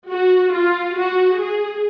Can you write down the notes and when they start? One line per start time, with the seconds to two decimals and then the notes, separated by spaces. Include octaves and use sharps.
0.10 F#4
0.54 F4
0.97 F#4
1.40 G#4